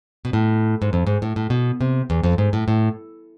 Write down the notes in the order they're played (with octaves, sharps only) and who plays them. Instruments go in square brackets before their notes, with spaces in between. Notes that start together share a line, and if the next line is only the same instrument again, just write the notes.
[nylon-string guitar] B2
A2
G#2
F2
G#2
A2
A2
B2
C3
E2
F2
G#2
A2
A2